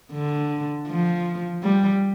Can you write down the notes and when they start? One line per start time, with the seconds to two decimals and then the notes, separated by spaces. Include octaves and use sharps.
0.12 D3
0.88 F3
1.63 G3